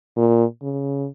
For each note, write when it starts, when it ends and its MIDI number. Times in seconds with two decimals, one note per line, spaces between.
0.17 0.44 46
0.62 1.08 49